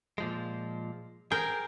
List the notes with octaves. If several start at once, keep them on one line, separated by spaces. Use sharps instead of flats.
A#2 F3 G#3
G#4 A#4 C5 G5